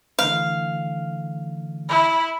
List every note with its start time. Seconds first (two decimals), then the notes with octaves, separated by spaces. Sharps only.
0.19 D3 E3 A3 F5
1.89 E4 B5